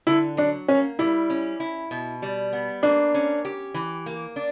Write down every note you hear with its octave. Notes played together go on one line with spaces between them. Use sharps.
D3 E4
F#3 D4
A#3 C#4
G3 E4
C#4
E4
B2
G3
B3
A#3 D4
C#4
G4
E3
A#3
D4